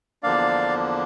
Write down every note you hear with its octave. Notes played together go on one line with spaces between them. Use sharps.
E2 D3 F3 A#3 D4 D5 F5